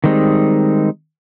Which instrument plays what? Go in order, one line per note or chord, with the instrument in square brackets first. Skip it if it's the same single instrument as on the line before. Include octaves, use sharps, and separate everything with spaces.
[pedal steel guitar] D#3 G3 G#3 C4 D#4